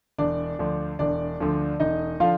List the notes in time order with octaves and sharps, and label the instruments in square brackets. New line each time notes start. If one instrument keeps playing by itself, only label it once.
[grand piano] E1 D4 D5
D2 D3 F3
E1 D4 D5
D2 D3 F3
E1 D#4 D#5
D3 F3 F4 F5